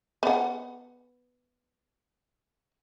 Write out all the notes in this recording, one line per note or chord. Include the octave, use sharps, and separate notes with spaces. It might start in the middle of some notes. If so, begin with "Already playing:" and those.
B3 F#5